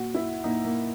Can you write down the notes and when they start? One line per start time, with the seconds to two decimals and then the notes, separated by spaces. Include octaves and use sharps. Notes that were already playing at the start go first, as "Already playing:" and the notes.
Already playing: A#2 F#4
0.14 E4
0.44 A#2 D#4
0.65 A#3